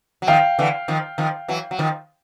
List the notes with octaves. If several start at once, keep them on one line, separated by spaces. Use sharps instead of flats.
F#3
D#3 F3 F5 G5
D3 E3
D#3 F3
D#3 F3
E3 F#3
F#3
D#3 F3